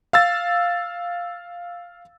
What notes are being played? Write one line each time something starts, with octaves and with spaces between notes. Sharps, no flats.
F5 E6 A6